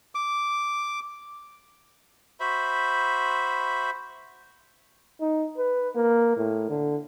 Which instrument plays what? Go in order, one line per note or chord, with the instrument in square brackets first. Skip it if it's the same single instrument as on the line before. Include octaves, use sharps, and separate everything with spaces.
[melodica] D6
F#4 C5 E5 B5
[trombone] D#4
B4
A#3
A2
D3